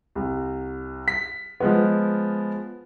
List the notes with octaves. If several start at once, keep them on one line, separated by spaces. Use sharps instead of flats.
C2
B6
F3 G#3 B3